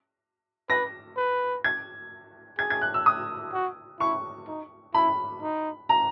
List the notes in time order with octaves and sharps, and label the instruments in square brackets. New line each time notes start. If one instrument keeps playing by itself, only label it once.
[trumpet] B4 [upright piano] A#6
[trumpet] B4
[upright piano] G#6
[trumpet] G#4 [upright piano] G#6
[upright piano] G#6
F#6
E6
D#6
[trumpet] F#4
[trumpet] E4 [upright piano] C#6
[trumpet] D#4
[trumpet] E4 [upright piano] B5
[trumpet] D#4
[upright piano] A#5